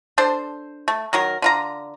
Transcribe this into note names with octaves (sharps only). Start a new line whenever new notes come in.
D4 A4 C5
A3
D#3 F#3 A#4
D3 F4 A#5